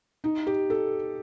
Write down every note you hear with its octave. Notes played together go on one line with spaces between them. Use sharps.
D#4
G4
A4